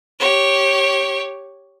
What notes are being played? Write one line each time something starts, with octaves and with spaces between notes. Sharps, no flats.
G4 C#5